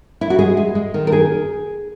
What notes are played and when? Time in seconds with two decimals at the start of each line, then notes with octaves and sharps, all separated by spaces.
0.21 E4
0.30 F#4
0.39 G#3 G#4
0.57 G#3
0.75 G#3
0.94 D#3
1.07 A#4
1.12 G#4